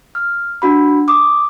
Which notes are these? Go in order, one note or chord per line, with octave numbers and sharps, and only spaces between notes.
F6
D4 F#4 B5
D6 D#6